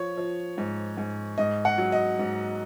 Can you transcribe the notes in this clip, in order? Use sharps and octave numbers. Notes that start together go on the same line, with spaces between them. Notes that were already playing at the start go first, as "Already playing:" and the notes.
Already playing: F3 C#5
F3
G#2
G#2
G#2 D#5
F#5
F#3
D#5
G#2